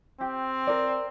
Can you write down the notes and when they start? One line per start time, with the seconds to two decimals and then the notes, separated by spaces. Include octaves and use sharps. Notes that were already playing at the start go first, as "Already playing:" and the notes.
0.21 C4 G4
0.67 A#4 D5